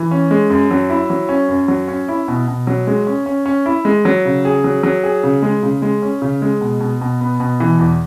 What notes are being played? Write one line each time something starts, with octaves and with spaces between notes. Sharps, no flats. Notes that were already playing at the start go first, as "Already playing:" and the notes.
Already playing: E3
C#4
G#3
F#2
F#3
E4
F#3
C#4
F#2
F#3
C#4
E4
B2
B2
F#3
G#3
C#4
C#4
C#4
E4
G#3
F#3
C#3
G#4
F#3
F#3
G#4
C#3
G#3
C#3
G#3
C#4
C#3
G#3
B2
B2
B2
B3
B2
E3
E2